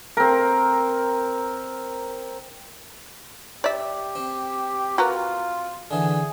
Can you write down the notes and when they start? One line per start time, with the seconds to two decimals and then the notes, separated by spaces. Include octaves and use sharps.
0.17 C4 A#4
3.64 G4 D5 E5
4.15 C4
4.98 F4 F#4 A#4 B4
5.91 D3 E3 G#4